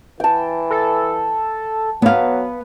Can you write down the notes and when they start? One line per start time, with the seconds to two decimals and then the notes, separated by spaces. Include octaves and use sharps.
0.20 E3 G5 A5
0.70 A4
2.02 F#3 B3 B4 F5